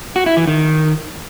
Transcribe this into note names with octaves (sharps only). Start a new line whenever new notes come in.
F#4
E4
E3
D#3